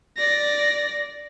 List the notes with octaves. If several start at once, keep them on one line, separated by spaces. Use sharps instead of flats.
D5 A#6